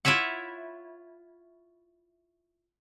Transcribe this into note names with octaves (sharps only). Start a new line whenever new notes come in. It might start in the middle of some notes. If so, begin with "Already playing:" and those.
E4 F4 C#5 E5 F#5